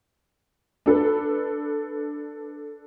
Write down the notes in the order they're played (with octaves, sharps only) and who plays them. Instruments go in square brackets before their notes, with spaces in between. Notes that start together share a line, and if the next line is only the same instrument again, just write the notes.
[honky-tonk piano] D4 A4 B4